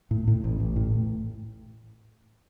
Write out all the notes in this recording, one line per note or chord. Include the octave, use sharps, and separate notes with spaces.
A2
A2
A1
A1
A2
A2